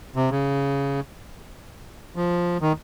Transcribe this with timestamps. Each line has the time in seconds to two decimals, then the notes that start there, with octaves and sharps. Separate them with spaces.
0.16 C3
0.31 C#3
2.16 F3
2.61 D#3